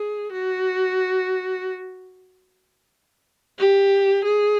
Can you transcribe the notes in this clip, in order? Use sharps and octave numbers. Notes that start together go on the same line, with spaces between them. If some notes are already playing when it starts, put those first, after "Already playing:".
Already playing: G#4
F#4
G4
G#4